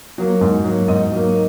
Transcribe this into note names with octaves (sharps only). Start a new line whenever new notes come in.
F#3 A#3
G#2
F#3 A#3
G#2 D#4 D#5
F#3 A#3